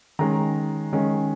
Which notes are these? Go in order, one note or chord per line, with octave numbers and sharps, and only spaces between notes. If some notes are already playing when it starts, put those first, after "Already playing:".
D#3 G#3 C#4 A#5
D#3 G#3 C#4